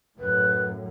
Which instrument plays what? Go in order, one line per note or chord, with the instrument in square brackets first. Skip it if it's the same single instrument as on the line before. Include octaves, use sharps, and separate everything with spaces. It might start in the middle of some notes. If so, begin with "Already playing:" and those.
[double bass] F#2 A2 [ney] B4